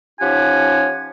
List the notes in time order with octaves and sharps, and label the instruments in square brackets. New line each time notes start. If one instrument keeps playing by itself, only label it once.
[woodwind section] F3 C#4 D#4 G4 F#5 G#5